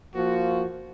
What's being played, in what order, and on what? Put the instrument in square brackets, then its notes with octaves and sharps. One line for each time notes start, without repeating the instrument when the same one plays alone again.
[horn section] F3 A#3 F4 F#4